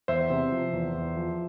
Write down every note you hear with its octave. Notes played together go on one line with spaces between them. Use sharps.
E2 C5 E5
C3
F3
E2
E2
F3